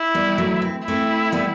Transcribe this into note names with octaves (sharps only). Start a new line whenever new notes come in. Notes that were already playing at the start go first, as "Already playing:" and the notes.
Already playing: E4
G3 B3
F#3 A3
C4
A3 C4 E4
G3 B3